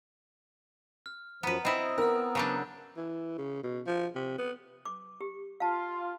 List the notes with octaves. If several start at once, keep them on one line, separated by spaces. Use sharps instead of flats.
F6
F#2 F3 B3 B4 A#5
C4 E4 D#5 B5 D#6 E6
B3 A#4 E6 F6
C#3 F#3 D4 A#5 D6 G6
E3
C#3
B2
F3
C3
B3
D6
G4
F4 F5 A5